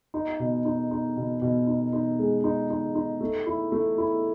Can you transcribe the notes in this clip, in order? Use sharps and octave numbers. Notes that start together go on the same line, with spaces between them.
D#4
B2
D#4
D#4
B2
B2
D#4
D#4
G#3
D#4
D#4
D#4
A3
E4
A3
E4